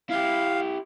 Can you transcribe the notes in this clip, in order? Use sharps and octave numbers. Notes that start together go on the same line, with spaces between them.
E4 G4 F5